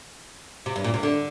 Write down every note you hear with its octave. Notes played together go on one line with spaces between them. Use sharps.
C3
G2
A#2
C3
D3